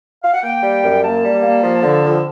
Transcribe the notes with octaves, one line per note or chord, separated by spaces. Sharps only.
F5
F#5
A#3 G5
G3
F#2
A#3 A5
G3
A#3
F3
D3
F2